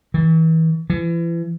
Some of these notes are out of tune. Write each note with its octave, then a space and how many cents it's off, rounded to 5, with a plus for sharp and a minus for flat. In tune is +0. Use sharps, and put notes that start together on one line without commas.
E3 -35
E3 +35